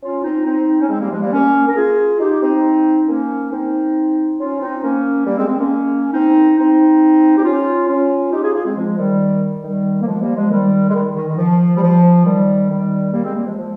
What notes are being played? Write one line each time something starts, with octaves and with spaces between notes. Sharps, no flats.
C#4 F4
C4 D#4
C4 D#4
C#4
G#3 C4
G3 A#3
F3 G#3
G3 A#3
A#3 C#4
A#4
F4 G#4
D#4 G4
C4 D#4
A#3 C#4
C4 D#4
C#4 F4
C4 D#4
A#3 C#4
G3 A#3
G#3 C4
G#3 C4
A#3 C#4
C4 D#4
C4 D#4
G4
C#4 F4
C#4 F4
D#4 G4
F4 G#4
F4 G#4
G#3 C4
F3 G#3
D#3 G3
D#3 G3
A#3
F3 G#3
G3 A#3
F3 G#3
D#3 G3
G#3
D#3 G3
D#3
D#3
F3
G3
F3
D#3 G3
D#3 G3
G3 A#3
G#3 C4
G3 A#3
F3 G#3
F3 G#3